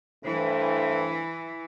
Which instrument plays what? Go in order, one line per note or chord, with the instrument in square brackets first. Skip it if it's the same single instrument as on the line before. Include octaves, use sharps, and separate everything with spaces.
[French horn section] G2 A3 C5 [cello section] E3